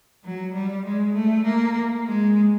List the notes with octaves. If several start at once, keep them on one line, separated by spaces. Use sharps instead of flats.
F#3
G3
G#3
A3
A#3
G#3